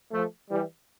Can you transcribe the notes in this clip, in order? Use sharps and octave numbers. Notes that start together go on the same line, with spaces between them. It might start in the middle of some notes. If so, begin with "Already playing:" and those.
F3 A3
E3 G3